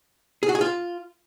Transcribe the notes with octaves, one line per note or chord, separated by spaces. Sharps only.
G#4
F#4
G#4
F4